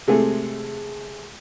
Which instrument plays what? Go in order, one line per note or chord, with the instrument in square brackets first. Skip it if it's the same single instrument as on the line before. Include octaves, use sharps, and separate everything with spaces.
[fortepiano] C3 G#3 A3 G#4